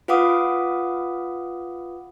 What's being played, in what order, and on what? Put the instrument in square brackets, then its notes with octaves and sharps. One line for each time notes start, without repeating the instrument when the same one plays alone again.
[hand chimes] F4 B4 F5 F#5 D6 D#6